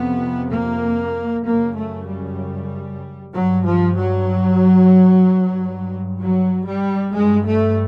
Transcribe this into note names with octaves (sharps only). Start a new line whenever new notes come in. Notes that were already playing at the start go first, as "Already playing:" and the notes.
Already playing: F2 C3 B3
A#3
F#2 C#3 A#3
A3
G3
G2 F#3
F3
F#3
G2
F#3
G3
G2 G#3
A3